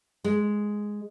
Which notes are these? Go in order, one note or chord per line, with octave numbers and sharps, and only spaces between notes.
G#3